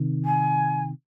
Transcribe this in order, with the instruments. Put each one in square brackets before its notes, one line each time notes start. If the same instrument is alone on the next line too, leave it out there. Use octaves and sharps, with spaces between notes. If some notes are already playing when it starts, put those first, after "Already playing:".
Already playing: [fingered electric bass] C3 D#3
[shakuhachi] G#5